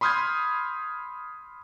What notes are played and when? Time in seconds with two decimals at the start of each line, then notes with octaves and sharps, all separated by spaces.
0.01 B5 C6 D#6 F6 G6 G#6